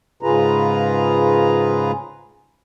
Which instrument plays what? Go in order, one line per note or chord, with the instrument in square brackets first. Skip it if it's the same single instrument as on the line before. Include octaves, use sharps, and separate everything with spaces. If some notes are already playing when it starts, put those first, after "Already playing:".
[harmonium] G#2 C#3 F4 G#4 B4 A#5